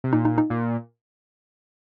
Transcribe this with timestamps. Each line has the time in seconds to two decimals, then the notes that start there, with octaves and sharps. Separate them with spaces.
0.04 C3
0.13 A#2 D#4
0.25 D#4
0.38 D#4
0.50 A#2